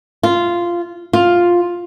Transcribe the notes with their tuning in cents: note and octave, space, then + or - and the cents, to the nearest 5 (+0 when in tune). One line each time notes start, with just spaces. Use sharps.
F4 -10
F4 +5